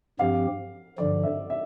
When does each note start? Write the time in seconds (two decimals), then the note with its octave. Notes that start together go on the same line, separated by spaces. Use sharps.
0.19 G2 F3 C4 G4 F5
0.98 G2 D3 F3 D5
1.23 E5
1.50 E5